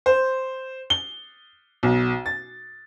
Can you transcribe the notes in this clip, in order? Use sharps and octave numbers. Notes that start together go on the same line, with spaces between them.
C5
G7
B1
A6